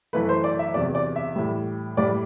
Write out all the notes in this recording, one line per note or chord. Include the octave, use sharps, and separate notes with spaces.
F#2 E3 A3 B4
C5
D5
E5
E2 C3 F#3 D5
D5
E5
A2 E3 G3
A2 G3 D5